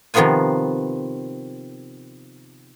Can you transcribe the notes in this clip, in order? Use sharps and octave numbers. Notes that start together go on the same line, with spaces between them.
C3 D#3 F3 B3 F4 G#5